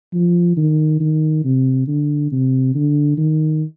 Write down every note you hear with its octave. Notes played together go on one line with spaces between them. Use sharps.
F3
D#3
D#3
C3
D3
C3
D3
D#3